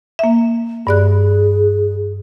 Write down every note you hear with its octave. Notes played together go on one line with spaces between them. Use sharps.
A#3 E5
G2 G#4 D5 F#6